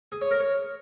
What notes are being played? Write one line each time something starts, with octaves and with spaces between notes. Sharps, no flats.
G#4
C#5
A#4
C#5